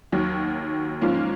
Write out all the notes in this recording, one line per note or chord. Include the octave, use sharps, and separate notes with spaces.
D#2 D#3 F#3
G#2 F3 A#3 C#4 F4